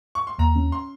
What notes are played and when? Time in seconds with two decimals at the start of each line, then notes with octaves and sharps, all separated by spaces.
0.15 C#6
0.27 C6
0.38 D#2 A#5
0.56 C#4
0.72 C6